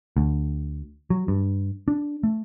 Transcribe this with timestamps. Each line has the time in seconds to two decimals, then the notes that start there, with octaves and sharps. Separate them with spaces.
0.17 D2
1.10 F#3
1.28 G2
1.88 D4
2.23 A3